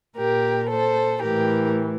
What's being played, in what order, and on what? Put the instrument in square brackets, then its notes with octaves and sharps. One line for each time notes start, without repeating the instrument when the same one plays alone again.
[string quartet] A#2 G4 A#4
A4 C5
A2 E3 G4 A#4